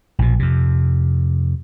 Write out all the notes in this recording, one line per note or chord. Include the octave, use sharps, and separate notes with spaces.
A#1 B2
F2 C3